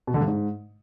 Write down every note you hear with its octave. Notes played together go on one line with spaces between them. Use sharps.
B2
D3
G2
G#2